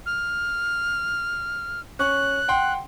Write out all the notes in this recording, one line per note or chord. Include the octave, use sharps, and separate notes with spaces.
F6
C#4 C#6 F#6
F#5 G5 C6